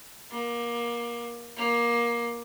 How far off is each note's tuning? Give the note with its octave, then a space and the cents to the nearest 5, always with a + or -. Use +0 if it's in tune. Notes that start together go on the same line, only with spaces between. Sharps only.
A#3 +25
A#3 +20